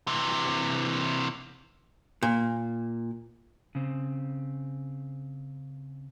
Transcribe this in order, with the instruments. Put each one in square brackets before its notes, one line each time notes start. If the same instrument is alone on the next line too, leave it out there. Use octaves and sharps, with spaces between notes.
[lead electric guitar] C3 E3
[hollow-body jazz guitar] A#2
[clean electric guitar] C#3 C4